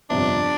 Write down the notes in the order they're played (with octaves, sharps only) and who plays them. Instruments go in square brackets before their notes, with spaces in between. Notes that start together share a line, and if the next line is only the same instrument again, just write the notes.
[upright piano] G1 F2 C3 [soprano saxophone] D4